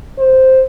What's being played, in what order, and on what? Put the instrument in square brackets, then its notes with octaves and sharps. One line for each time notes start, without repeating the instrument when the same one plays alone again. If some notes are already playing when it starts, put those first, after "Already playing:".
[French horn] C5